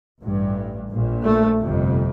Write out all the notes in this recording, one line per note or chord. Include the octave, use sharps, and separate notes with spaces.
A1 G2
A#1 A#2
A3
G1 F2 C3